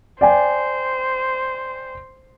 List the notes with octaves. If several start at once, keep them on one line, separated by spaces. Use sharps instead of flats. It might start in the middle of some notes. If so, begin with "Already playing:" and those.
C5 D5 G5 G#5